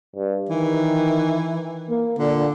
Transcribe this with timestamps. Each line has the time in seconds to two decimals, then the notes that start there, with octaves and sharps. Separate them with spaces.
0.16 G2
0.49 D#3 E3
1.90 A#3
2.19 A#2 D3